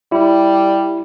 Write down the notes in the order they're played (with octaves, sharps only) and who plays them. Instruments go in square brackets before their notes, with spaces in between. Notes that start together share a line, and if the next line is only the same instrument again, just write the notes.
[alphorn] G3 [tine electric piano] E4